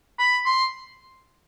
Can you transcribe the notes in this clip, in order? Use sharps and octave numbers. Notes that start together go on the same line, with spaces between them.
B5
C6